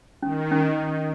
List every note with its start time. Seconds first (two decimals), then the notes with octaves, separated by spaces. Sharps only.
0.23 D#3 C#4
0.51 C#4